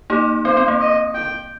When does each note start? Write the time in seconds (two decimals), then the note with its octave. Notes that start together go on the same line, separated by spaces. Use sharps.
0.10 A#3 D#4 G4
0.45 C4 C5
0.57 C4
0.68 A#3
0.81 D#5
1.15 G5